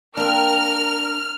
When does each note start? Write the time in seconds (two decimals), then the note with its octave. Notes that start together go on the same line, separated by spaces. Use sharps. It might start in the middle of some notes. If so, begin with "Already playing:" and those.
0.17 A#3 C4 D4 A#4 F6